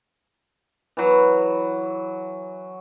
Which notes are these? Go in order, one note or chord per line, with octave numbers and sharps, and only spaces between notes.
E3 F#3